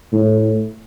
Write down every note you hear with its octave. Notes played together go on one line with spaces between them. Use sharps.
A2